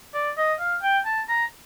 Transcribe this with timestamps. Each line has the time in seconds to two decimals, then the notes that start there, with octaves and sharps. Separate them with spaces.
0.14 D5
0.37 D#5
0.59 F5
0.82 G5
1.05 A5
1.29 A#5